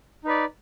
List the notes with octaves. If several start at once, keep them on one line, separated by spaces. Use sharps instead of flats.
D#4 B4 D5